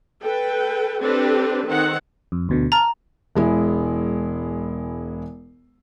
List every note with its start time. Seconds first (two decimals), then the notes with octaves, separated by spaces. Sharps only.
0.23 A4 B4 G5
1.02 C4 D4 G4 A4 B4
1.67 D#3 C4 F#5
2.32 F2
2.49 D2 B2 D3
2.72 A5 A#5 F6
3.35 E1 G#3 E4